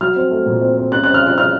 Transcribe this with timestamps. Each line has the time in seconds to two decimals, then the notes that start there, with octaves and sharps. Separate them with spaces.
0.01 F#3 F6
0.16 C4
0.31 A3
0.46 A#2
0.62 C4
0.77 C4
0.92 C#4 F#6
1.04 C#4 F#6
1.14 F6
1.22 F4 F#6
1.38 C#4 F6